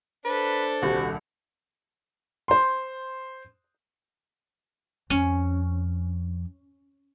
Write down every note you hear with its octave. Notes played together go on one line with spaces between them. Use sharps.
D4 A4 B4 C5
D#1 C2 F#4
C5 C6
F2 C#4